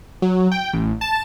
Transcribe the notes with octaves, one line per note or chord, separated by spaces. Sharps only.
F#3
G5
A1
A5